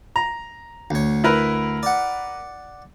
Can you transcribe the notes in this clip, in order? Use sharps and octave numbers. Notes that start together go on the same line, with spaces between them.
A#5
D2 C#5
E4 A#4 B4
D5 F#5